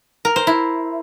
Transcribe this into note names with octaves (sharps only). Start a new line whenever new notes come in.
A#4
C5
E4